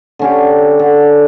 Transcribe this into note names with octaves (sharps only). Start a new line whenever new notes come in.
D3 C#4 G4
D3